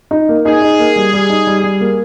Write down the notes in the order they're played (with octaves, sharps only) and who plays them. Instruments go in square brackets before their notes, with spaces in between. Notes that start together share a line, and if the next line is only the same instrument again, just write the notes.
[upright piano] D#4
A#3
[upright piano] D#4 [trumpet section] G#4
[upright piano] D#4
A#3
G3
G3
D#4
G3
G3
A#3